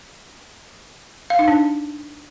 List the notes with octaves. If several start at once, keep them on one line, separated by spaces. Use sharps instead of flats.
F5
D#4
D4